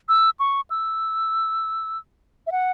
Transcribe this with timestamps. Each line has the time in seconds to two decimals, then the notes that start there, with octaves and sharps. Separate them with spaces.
0.09 E6
0.40 C#6
0.70 E6
2.47 E5
2.52 F#5